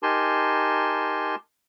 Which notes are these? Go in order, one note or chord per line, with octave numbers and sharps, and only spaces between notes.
D#4 G4 A#4 G#5 A5 C6